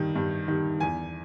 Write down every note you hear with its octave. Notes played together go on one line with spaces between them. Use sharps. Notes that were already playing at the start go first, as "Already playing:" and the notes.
Already playing: G2 D#3 G3
G2
D#3 G3
E2 G#5